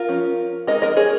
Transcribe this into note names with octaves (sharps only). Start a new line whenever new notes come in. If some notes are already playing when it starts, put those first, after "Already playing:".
Already playing: F4 A#4
F3 C#4
G#3 D#4 A#4 D#5
A#4 D#5
G#4 C#5